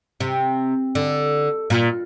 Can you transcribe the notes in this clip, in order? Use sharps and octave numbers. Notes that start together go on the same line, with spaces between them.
C3
D3
A#2